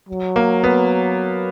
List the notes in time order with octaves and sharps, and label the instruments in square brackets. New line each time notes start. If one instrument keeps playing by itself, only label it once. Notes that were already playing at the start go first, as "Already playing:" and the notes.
[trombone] F#3
[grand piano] A#3
B3